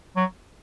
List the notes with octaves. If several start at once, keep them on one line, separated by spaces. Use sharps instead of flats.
F#3